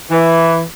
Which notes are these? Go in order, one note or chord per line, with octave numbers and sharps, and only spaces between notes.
E3